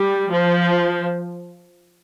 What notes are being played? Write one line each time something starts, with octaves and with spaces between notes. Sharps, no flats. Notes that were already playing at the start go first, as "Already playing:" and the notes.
Already playing: G3
F3